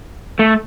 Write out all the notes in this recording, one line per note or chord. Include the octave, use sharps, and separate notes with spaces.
A3